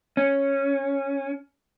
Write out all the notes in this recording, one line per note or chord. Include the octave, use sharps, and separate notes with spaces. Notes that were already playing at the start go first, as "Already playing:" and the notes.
C#4